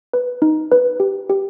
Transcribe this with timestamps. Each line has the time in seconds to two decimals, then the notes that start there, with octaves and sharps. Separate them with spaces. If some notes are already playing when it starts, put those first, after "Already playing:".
0.13 B4
0.42 D#4
0.72 B4
1.00 G4
1.30 G4